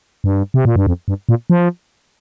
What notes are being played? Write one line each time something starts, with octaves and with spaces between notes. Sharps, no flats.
G2
C3
A#2
G2
F2
G2
A#2
F3